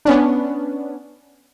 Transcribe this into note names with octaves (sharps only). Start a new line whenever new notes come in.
B3 C#4 D4